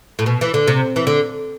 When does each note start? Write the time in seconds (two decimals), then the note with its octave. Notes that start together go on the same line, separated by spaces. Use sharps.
0.19 A2
0.26 B2
0.41 E3
0.54 D3
0.67 C3
0.96 E3
1.07 D3